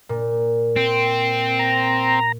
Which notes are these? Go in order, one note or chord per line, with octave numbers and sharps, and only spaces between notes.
A#2
C4
A#5